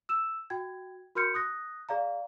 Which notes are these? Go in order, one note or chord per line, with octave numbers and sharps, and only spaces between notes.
E6 E7
F#4 G5 G#6
F#4 A#4 C6 F6 G6 C#7
D#6 F#6 A#6
G#4 D5 F5 A#5